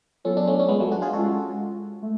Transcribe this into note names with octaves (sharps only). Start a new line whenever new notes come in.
F#3 B3 C#4 F4 A4
D4
A3 C#4
C#4
G#3 B3
F#3 A3
D4 F#4
F4 G#4
G#3 C#4 F4 F#4 A4
A3